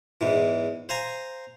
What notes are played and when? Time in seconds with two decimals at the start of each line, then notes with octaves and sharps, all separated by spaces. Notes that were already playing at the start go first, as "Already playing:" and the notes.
0.21 E2 G#2 E3
0.89 C5 F5 G#5 A#5